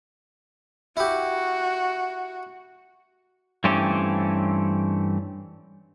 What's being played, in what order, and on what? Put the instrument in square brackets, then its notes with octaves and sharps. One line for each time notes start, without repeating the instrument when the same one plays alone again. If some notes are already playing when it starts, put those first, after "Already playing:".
[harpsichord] E4 G4 [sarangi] F#4
[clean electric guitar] G2 E3 A3 C4 C#4 G4